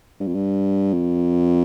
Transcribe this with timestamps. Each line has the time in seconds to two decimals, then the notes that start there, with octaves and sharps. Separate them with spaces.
0.20 G2
0.27 F2
0.35 G2
0.93 F2